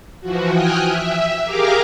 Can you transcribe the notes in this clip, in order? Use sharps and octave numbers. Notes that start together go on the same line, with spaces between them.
E3 F3 F#4
G5 G#5 D#6 F6 F#6
E5
G4 G#4 A#4 F5 A#5 D6